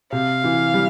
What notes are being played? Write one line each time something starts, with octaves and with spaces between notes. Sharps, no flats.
C3 F5
E3
G3